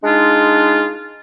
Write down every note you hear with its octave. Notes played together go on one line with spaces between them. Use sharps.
G#3 D4 D#4 F4